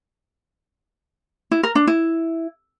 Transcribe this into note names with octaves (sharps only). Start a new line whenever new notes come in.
E4
A#4
D4
E4